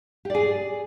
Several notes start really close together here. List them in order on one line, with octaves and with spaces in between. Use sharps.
G4 D5 G#4